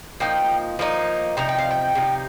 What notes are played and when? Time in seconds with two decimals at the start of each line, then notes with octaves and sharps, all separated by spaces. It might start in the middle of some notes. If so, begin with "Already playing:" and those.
0.20 F3 A#3 D#4 G5
0.79 F3 A#3 D#4
1.37 C3 F3 D#4 A#5
1.49 G5
1.59 F5
1.71 G5
1.95 C3 F3 D#4